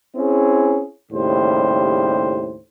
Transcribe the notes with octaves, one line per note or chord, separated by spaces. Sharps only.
C4 C#4 E4 G#4
D#2 A2 C#3 G3 C5